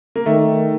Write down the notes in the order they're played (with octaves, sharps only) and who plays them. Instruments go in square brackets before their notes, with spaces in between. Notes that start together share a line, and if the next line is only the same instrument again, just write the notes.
[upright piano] A#3
[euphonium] D#3 [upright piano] A3